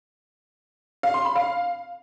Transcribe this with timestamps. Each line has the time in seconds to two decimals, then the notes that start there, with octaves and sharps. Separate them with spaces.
1.03 F5
1.14 C6
1.25 B5
1.36 F5